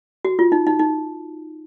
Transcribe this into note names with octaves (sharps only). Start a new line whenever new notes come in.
F#4
F4
D#4
D#4
D#4